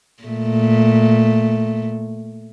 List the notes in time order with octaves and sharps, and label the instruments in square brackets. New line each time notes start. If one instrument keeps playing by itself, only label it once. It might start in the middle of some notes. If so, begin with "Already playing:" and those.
[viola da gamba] A#2 A3